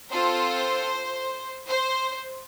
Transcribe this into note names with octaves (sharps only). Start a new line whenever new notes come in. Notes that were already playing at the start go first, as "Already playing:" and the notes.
C4 F4 A4 C5
C5